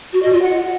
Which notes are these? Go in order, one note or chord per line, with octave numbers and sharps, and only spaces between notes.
F#4
D#5
F4
F#5